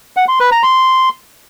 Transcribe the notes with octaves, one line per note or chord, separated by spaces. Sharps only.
F#5
C6
B4
A#5
C6